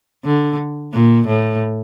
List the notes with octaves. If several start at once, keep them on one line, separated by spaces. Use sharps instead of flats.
D3
A#2
A2